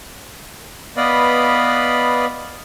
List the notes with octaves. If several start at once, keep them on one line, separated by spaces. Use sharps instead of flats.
B3 B4 D5 D#5 F5 B5